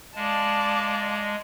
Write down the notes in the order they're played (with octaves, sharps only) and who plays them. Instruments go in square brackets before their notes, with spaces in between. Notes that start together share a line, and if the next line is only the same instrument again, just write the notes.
[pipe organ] G#3 [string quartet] D5 F5 A5